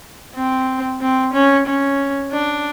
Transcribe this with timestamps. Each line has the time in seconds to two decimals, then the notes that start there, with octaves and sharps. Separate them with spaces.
0.35 C4
1.01 C4
1.34 C#4
1.67 C#4
2.32 D4